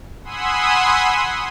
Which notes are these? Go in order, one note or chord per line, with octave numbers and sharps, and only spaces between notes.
F#5 G#5 B5 C6 D#6 E6